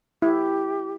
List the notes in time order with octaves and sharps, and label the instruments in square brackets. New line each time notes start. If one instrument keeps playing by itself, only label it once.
[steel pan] E4 [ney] G4